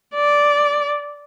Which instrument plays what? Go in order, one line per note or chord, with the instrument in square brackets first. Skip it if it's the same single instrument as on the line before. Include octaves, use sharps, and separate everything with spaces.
[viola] D5